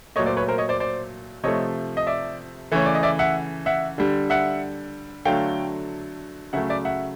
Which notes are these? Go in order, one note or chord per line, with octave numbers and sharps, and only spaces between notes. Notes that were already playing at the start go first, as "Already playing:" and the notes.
A#2 F#3 A3 C#5 D#5
C5 D5
B4 C#5
A#4 C5
C#5 D#5
C5 D5
C5 D5
C3 F3 A3 C#5 D#5
D#5
D5 E5
C#3 E3 A3 C#5
D5
D#5
D5 E5
E5 F#5
E5 F#5
D3 G3
E5 F#5
D3 F#3 A3 F5 G5
C#3 F#3 A3 E5 F#5
D5 E5
E5 F#5